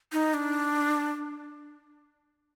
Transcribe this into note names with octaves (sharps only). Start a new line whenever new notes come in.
D#4
D4